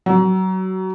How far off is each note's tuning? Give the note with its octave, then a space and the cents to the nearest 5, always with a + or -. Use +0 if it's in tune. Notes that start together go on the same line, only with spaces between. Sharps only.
F#3 +25